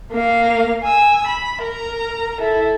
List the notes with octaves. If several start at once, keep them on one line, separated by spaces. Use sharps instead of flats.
A#3 F5
G#5 E6
B5
A#4 A#5
E4 A4